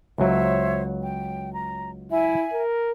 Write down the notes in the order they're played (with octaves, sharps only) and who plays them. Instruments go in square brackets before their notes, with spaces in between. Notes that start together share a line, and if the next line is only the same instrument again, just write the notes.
[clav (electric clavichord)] C#2 F#3 [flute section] C5 C#5 E5
[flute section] G5
A#5
[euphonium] E4 [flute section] E5 G#5
[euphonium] A#4